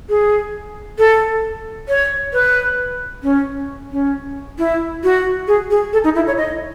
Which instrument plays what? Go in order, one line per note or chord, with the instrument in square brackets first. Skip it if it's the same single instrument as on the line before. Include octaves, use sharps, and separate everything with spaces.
[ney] G#4
A4
C#5
B4
C#4
C#4
E4
F#4
G#4
G#4
A4
D#4
E4
C#5
D#5